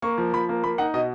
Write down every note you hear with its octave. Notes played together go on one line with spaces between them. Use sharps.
A#3 C#6
F3
F3 B5
A#3
A#3 B5
D#4 F#5
B2 D#5